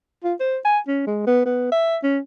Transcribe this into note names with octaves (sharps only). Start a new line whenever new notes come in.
F4
C5
G#5
C#4
G#3
B3
B3
E5
C#4